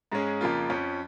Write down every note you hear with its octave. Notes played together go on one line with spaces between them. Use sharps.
G#2 G#3 C#4 G#4
F2 C#3 F3 A#3 F4
F2 F3 C#4